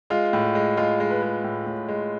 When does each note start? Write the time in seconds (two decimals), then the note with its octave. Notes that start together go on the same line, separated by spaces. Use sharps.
0.10 G#3 F4
0.33 A2
0.55 G#3
0.77 G#3 F4
1.00 G#3
1.11 B4
1.22 G#3
1.44 A2
1.67 A2
1.88 G#3